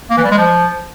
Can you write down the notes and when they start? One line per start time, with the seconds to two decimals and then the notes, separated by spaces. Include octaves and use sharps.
0.10 A#3
0.17 E3
0.24 G3
0.31 G#3
0.38 F3